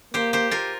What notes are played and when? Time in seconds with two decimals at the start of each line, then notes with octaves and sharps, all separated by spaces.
0.14 A#3 G4 C5
0.33 G4 C5
0.51 F4 A#4